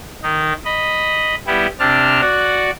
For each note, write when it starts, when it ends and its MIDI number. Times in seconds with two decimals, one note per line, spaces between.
0.23 0.53 51
0.23 0.53 63
0.65 1.35 75
0.65 1.35 83
1.47 1.67 55
1.47 1.67 59
1.47 1.67 64
1.47 1.67 67
1.79 2.21 48
1.79 2.21 60
1.79 2.21 62
1.79 2.21 81
1.79 2.21 89
2.21 2.71 66
2.21 2.71 74
2.21 2.71 78